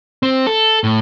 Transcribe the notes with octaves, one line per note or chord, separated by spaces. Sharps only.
C4
A4
A2